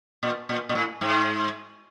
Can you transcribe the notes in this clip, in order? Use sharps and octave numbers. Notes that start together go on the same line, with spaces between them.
A#2
A#2
A#2
A2
G#2